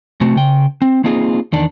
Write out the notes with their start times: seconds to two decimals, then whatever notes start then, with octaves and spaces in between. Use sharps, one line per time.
0.21 C3 A3 C4 F#4
0.36 C#3 G5
0.82 C4
1.04 A#3 C4 D#4 F4 G#4
1.53 E2 D#3 D4